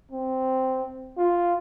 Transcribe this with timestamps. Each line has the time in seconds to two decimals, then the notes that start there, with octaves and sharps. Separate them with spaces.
0.11 C4
1.17 F4